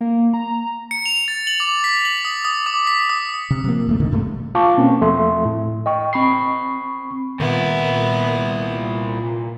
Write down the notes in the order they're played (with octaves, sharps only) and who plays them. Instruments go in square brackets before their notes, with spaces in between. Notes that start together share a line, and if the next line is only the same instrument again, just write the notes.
[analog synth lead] A#3
A#5
[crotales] C#7
F7
A6
F#7
D6
B6
F#7
D#6
D#6
D6
B6
D#6
[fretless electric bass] C3
C3 F3 A#3
F#1 D#2 A3
E2 A#2 D3 D#3
A1 G2 C3 A3
[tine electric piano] F4 F5 A5 C#6 D6
B2 A#3 C4 C#4
E2 F3 A3 A4 E5 C6
A2
D#5 G5 C#6
C4 B5 C#6 C7
[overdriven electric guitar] C2 E4 [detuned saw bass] A#2 [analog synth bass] D#3 [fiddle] B3